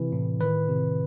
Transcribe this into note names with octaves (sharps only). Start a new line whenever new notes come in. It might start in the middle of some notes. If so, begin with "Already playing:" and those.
Already playing: C3 E3
A2
D#3 B4
C3